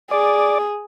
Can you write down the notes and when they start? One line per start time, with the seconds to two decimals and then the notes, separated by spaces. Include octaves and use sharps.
0.11 G#4 D5